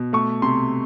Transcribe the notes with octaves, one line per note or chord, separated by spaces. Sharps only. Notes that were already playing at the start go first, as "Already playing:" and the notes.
Already playing: B2
A3 C#6
C3 C6